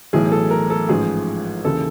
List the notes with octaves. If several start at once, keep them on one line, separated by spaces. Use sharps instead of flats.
B1 A2 E3 G#4
A4
A#4
A4
A1 G#2 F3 G#4
D#2 C#3 E3 A4